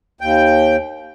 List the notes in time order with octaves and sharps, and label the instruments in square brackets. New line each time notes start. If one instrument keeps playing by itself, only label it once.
[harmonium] D#2 G5